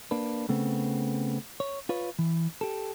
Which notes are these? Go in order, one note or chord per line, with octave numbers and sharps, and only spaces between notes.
A#3 D4 B4
C#3 A3 B3 C4
C#5
F4 B4 C#5
E3
G4 A4